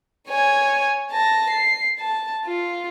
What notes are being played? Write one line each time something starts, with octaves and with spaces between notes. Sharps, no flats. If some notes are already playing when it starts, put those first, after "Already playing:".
C#5 G#5
A5 A#6
C7
A5
F4